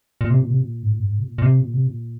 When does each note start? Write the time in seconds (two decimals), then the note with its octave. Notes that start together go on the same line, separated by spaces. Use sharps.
0.21 A#2
0.30 C3
0.40 A#2
0.50 C3
0.61 A#2
0.83 G#2
0.91 A#2
0.99 G2
1.07 G#2
1.19 C3
1.25 A#2
1.38 A#2
1.42 C3
1.61 A#2
1.74 C3
1.87 A#2